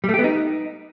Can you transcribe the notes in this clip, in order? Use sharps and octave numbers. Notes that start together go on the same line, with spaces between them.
G3
A3
G4
B3
D#4